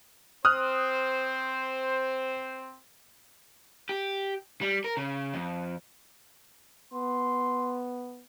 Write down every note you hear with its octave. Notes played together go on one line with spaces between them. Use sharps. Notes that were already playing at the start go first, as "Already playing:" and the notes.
C4 C5 D#6 F6 F#6
G4
G3
A#4
C#3
F2
B3 C6